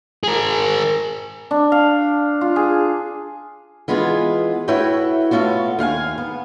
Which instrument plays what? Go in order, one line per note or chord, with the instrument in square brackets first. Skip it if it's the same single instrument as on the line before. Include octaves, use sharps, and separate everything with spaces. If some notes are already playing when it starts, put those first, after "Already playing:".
[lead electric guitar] G#4 A#4
[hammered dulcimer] D4
F5
F4
G#4
[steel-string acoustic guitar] E3 G#3 B3 F4 G#4
A3 E4 F#4 B4 C#5 G5
A3 B3 C#4 F4 F#4
D#2 F5 F#5 G#5
B3